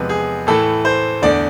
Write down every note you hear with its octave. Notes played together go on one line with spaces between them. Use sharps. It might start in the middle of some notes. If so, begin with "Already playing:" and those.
Already playing: E2 C3 F3 G#3 B4
G#4
A2 E3 A3 A4
C5
E2 D3 A3 D5